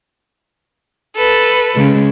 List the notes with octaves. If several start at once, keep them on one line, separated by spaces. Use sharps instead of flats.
A4 B4
C#3 G#3